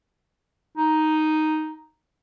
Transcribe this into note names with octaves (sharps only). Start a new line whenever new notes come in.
D#4